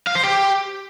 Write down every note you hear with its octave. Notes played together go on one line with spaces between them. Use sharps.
F5
C5
G4